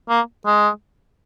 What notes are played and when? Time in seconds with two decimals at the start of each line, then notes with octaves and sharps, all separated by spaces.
0.09 A#3
0.46 G#3